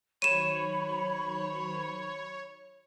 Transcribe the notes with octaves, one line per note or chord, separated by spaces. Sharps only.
D#3 F#3 C5 C#5 B5 D#7 E7